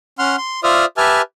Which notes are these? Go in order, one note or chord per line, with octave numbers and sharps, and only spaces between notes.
C#4 F#5 C6 F6
C6
F4 C5 D5 E5 D#6 F6
G4 B4 E5 G#5 A5 F6